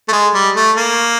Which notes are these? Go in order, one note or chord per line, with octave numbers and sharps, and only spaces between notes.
A3
G#3
G3
A3
A#3